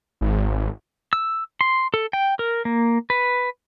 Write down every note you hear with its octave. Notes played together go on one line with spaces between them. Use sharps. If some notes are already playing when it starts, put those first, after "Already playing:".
G#1
E6
C6
A4
G5
A#4
A#3
B4